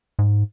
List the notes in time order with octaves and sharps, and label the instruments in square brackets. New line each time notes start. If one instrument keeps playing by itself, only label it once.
[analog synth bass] G#2